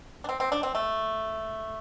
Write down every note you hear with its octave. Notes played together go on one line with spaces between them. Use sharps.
D4
C4
C4
D4
C4
A3